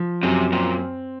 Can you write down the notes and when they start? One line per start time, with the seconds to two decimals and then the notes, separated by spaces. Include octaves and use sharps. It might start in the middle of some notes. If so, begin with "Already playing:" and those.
Already playing: F3
0.23 F#2 C3
0.52 A#2 C4